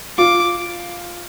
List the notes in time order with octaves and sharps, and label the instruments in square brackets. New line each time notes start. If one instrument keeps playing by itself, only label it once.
[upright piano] F4 [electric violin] D6